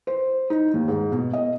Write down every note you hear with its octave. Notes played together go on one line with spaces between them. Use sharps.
C5
D#4
D#2
G#2
B2
D#5